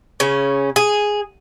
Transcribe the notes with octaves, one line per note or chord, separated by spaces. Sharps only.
C#3 C#4
G#4